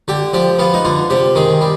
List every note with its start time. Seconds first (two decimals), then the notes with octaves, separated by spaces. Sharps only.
0.08 D3 G4
0.33 F3 G4
0.59 B3 F4
0.74 D#4
0.85 D3 F4
1.10 C3 G4
1.35 D#3 G#4
1.61 G3